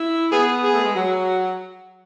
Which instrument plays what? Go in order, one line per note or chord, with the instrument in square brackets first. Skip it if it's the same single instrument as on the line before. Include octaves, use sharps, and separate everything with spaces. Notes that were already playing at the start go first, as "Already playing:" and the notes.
Already playing: [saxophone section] E4
[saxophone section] B3 [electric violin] G#4
[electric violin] G#4
[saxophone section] A3
G#3
F#3